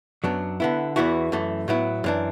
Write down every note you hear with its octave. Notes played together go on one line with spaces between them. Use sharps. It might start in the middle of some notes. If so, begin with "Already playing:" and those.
F#2 F#3 B3 D4
D3 B3 E4
E2 E3 B3 E4 F#4
F#2 E3 A3
A2 F#3 B3 E4
F#2 E3 D4